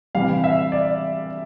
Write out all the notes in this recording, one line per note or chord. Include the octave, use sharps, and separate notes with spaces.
C3 E3 G3 F5
E5
D5